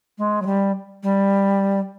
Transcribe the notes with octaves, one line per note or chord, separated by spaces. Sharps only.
G#3
F#3
G3
G3